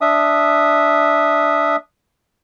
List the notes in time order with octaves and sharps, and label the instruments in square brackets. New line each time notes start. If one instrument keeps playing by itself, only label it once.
[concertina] D4 E5 D#6